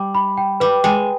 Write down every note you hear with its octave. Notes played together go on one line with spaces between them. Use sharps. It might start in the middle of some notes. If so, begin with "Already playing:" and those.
Already playing: G3
B5
G5
G3 B4
G#3 G5